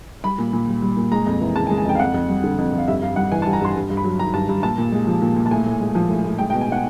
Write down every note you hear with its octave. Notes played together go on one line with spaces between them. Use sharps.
G3 B5
A#2
A#2
G3
G3
A#2
G#3 A#5
F2
E3
C#3 A5
G#5
G#3
G#5
F2 G5
F5
F2 F#5
F2
G3
D3
F2
F2 F5
G2 E5
G2 F5
G3 F#5
E3 G#5
A5
G2
A#5
G2 C6
G2
G2
B5
F#3
D#3 A#5
G2 A5
G2
A#2 A5
A#2
G#3
F3
A#2
A#2
A5
A2 G#5
A2
G#3
F3
A2
A2
G#3 G5
G5
B2
G#5
B2 F#5